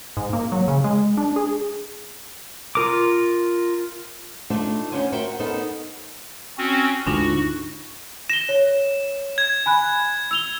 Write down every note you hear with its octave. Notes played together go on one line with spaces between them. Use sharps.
G#2
A#3
F#3
C#3
G#3
D4
G#4
F4 A#4 D6
A3 D4 D#4 F4 C5 E5
D2 G#2 C#4 F4 C5 G#5
F#4 A#4 C5 E5 G5
B3 D#4 A4 A#4 C5
C4 C#4 F#4
D2 G#2 D3 D4 D#4 F4 F#4
A#6 E7 G7
C#5
G#6
G#5 B5 F#6
E6 F7 G7